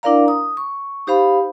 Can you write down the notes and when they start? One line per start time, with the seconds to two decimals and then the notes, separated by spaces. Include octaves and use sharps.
0.03 D4 E4 A#4 D5 F5 A#5
0.28 D#6
0.57 C#6
1.07 D#4 G4 C5 F5 B5